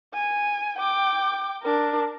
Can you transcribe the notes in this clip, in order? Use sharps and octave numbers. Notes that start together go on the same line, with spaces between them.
G#5
G5 D6
D4 A#4